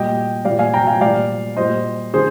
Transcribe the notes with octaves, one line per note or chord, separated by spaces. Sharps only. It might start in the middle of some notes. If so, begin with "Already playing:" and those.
Already playing: A#2 G3 D#5 G5
A#2 G3 D5 F5
F5 G#5
G5 A#5
F5 G#5
A#2 G3 D5 F5
A#2 G3 C5 D#5
D3 G#4 C5